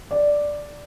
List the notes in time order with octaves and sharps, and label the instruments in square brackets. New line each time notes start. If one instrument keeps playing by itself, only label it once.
[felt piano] D5